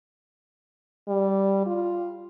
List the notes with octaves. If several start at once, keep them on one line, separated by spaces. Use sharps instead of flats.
G3
F4